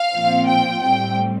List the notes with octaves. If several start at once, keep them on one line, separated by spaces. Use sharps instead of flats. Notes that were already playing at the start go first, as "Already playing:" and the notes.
Already playing: F5
A#2 F3 C4 F4
G5
A2 G3 C4 G5